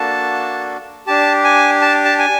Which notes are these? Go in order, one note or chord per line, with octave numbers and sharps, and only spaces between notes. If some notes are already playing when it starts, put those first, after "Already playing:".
Already playing: A#3 D4 F#4 A4 A5
D4 G4 A5
G#5
A5
A5
G#5